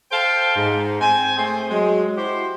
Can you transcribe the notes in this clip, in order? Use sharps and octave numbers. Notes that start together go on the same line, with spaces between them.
A4 C5 F5 G5 A5
G#2
C4 G5 G#5
A3 C4 G#4 C5
F#3 G#3
E4 F#4 G4 C5